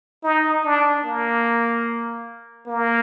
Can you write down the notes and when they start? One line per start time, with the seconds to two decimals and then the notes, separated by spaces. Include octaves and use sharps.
0.24 D#4
0.65 D4
1.05 A#3
2.67 A#3